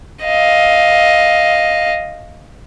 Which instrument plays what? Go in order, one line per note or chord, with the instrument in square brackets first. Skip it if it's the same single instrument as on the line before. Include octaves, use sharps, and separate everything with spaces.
[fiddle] D#5 F5